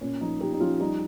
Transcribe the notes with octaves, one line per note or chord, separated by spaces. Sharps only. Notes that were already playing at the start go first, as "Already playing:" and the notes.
A#2 C#4
F3 D#4
F3 D#4 G4
D#4
F3 C#4 F4
G3 D#4